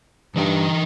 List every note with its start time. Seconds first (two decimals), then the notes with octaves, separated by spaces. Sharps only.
0.36 G2 E3 D#4 G5